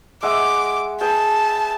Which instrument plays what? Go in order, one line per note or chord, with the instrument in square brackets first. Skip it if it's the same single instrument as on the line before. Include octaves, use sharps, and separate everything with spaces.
[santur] G#3 E5 F#5 [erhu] D6
[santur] G#4 B4 G5 [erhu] A5